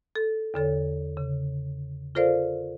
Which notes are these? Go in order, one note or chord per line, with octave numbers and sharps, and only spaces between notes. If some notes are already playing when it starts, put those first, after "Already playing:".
A4
E2 D3 A4 C#5
C#3
F4 A4 A#4 C5 D5 F5